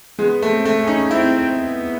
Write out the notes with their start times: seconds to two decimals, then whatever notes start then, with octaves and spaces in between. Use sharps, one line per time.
0.19 G#3 B3
0.42 A3
0.49 C4
0.65 A3
0.81 C#4
0.87 D#4
1.10 C4 E4
1.57 B3